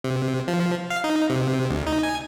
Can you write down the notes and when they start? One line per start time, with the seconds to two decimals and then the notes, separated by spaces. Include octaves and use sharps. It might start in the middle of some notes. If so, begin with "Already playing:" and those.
0.04 C3
0.48 F3
0.90 F5
1.04 D#4
1.30 C3
1.70 D2
1.87 D#4
2.03 G#5